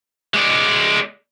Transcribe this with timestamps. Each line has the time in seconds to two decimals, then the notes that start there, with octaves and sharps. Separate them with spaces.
0.34 G#3 D5